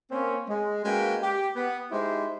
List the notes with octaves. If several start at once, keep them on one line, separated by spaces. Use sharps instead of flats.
A#3 C4 C#4
G#3
G#3 A#3 C#4 F#4 B4 G5
G4
B3
G#3 D#4 E4 G4 C5